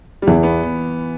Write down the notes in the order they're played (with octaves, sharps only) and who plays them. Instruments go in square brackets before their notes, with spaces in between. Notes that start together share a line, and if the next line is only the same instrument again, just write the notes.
[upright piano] G3
[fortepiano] E2 [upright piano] E3
[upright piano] B3